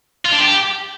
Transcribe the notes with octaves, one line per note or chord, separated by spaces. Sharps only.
F4
D4
G4